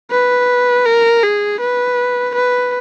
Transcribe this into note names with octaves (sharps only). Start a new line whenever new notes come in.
B4
A#4
G#4
B4
B4